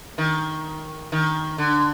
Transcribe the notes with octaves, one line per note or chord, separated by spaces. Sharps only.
D#3
D#3
D3